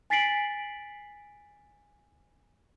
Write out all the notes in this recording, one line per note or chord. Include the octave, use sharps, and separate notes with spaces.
G#5 A6 B6 C7 D7 F#7